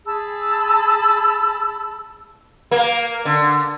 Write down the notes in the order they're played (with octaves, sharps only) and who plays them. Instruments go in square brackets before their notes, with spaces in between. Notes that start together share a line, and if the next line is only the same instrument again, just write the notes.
[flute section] G#4 A5 B5 E6
[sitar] A#3
D3